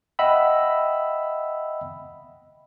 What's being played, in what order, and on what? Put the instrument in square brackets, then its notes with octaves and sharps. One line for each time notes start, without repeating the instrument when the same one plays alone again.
[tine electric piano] D#5 E5 F#5 G5 B5 E6